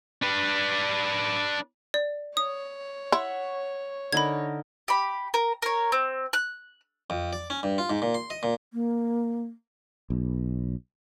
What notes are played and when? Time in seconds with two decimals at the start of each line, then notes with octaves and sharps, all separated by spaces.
0.23 D4 B4
1.94 D5
2.37 C#5 D#6
3.12 E4 E5 F#5 C#6
4.13 D3 D#4 A#4 B5 G#6
4.88 G4 B5
5.34 A#4
5.62 A#4 C#5
5.92 C4
6.33 F#6
7.10 F2
7.33 D5
7.50 C#4
7.63 G2
7.78 F4
7.90 G#2
8.02 A#2
8.14 C6
8.30 D#5
8.43 A#2
8.73 A#3
10.10 B1